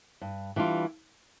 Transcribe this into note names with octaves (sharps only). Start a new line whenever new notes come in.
G2
E3 G3 D4 F4